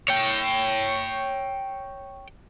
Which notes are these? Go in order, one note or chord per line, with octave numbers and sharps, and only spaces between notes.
C#5 G5